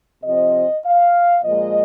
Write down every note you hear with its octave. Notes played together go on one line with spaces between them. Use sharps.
C3 F3 C4 D#5
F5
A#2 F3 G#3 D#5